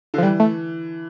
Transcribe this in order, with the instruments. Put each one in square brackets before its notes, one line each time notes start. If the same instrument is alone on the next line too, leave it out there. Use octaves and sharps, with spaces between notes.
[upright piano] D3
[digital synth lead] F3
[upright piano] E3 [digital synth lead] G3
[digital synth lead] A3